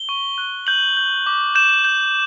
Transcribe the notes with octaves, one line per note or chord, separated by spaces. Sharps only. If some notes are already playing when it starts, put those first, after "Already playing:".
Already playing: G7
C#6
F#6
G6 F#7
G6
D6
G6 E7
G6